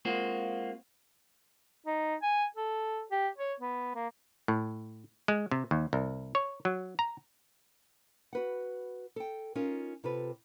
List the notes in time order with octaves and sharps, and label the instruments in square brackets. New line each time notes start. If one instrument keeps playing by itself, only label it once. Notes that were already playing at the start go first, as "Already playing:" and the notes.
[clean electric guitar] G#3 A#3 C4 F4 F#4
[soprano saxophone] D#4
G#5
A4
G4
C#5
B3
A#3
[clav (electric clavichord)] A2
G#3
C3
D#2
C2
C#5
F#3
A#5
[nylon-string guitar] F#4 B4 F#5
A4 G5
C#4 D#4 F4 A#4
C3 F4 A4 B4